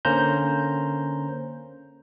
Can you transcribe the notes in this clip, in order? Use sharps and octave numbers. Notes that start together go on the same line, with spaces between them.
D3 A#3 C#4 C5 A#5 G6